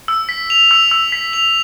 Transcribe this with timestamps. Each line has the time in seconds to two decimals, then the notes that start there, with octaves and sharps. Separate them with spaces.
0.08 E6
0.29 B6
0.50 F7
0.71 E6
0.91 E6
1.12 B6
1.33 F7